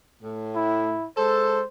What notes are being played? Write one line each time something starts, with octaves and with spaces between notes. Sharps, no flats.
A2
E4
G#3 A4 C5